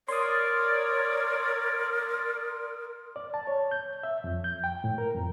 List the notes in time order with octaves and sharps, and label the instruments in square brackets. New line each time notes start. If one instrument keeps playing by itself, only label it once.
[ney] A#4 [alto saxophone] C#5 [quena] D5 [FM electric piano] C6 D#6
[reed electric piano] D5
A5
C#5
G6
E5
F2
G6
G5
A2
A#4
F2